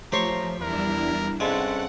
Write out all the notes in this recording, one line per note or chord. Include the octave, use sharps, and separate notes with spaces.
F3 A3 G4 C5 C#5 A#5 C6 C#6
E2 G3 D4 E4 A#4
G2 C3 G#3 C#4 A4 F#5